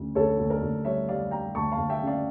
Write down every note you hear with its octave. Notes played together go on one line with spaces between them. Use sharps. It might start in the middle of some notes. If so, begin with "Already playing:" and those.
Already playing: D2 C#3
D2 A4 C#5
D2
A#4 D5
D2
G3 C#5 E5
G3 D5 F5
G3 G5 A#5
D2 A5 C#6
F5 A5
D2
E5 G5
C#3
D5 F5